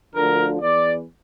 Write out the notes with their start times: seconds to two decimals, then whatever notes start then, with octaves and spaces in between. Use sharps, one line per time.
0.15 D2 D3 F3 A#4
0.60 E2 E3 D5